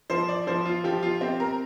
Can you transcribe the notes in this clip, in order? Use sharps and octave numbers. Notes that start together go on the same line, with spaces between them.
F3 C5
D5
F3 C5
F4
F3 G4
F4
C4 G4
A#4